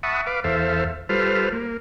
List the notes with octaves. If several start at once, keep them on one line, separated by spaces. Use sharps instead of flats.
E5 F#5 A5 B5 C#6 D#6
B4 F5 D6
E2 A4 C5 E5 F5
G3 F4 A4 B4 C5 F6
A#3